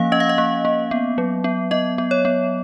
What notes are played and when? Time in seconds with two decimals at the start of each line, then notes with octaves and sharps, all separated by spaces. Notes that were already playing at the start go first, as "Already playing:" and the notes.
Already playing: F3 A#3 C#4 F5
0.12 C#4 D#5
0.20 F5
0.29 D#5
0.38 A#3
0.65 A#3
0.91 B3
1.18 F#3
1.44 B3
1.71 B3 D#5
1.98 B3
2.11 C#5
2.25 B3